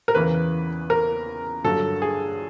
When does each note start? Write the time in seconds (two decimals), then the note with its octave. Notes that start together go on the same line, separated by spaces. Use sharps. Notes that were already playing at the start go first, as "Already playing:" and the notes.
0.08 A#4
0.15 E2 C#3 E3 B4
0.90 A#4
1.64 G2 D3 F#3 A4
2.02 G#4